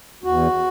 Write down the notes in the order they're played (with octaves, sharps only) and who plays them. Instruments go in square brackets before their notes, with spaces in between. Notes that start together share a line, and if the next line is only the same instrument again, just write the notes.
[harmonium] E2 F#4